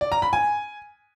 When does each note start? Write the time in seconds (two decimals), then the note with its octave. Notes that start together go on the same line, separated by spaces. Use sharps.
0.01 D5
0.12 A#5
0.22 B5
0.33 G#5